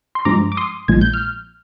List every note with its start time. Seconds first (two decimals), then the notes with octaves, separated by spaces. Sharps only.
0.15 C6
0.25 G2 F3 G#3 A#5 D6
0.52 D6
0.57 C6 D#6
0.88 A#1 A#2 F3 G#3 G#6
1.01 G6
1.13 F6